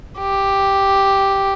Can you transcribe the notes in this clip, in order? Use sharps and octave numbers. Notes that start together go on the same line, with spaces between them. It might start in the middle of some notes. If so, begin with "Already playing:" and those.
G4